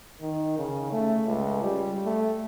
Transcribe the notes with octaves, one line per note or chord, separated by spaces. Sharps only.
D#3
C#3
A3
C#2
G3
A3